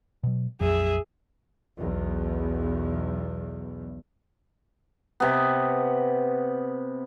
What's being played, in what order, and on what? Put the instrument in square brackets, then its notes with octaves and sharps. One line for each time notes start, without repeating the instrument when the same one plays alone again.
[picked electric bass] B2 F#3
[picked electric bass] A#1 F2 F#3 [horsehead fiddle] G#4 E5
[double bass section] B1 E2
[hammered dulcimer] C3 B3